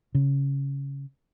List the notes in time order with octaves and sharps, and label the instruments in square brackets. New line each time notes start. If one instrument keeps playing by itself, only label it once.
[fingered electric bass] C#3